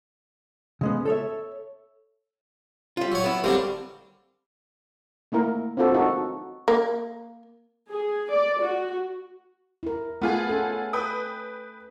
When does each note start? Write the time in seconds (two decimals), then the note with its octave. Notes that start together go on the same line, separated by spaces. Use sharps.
0.81 C#3 G#3 B3
1.05 A4 C#5 E5
2.97 G3 F4
3.12 F#3 C#5
3.24 B3 E4
3.44 D3 G3 A#3 C4 D4 G4
5.32 A3 A#3 E4 A#4
5.77 C4 D4 F4 F#4 A4
5.94 D#4 F#4 A4 A#4
6.68 A#3
7.91 G#4
8.31 D5
8.62 F#4
9.83 E4 A#4
10.22 A3 B3 F4 G#4 A4
10.49 C#4 A4
10.93 B4 G5 D#6